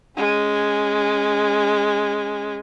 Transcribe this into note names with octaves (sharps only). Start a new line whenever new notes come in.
G#3 C#4